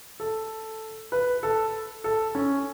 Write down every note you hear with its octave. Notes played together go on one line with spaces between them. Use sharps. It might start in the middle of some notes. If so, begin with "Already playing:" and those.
A4
B4
A4
A4
C#4